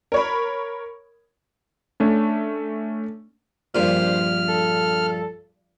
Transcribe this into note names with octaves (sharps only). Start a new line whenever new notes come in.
A#4 C#5 B5
A3 C#4 D4
A#1 G2 A#2 C5 F6
A4